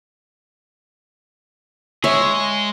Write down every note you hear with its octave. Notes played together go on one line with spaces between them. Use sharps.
G#3 G#4 C#5 E5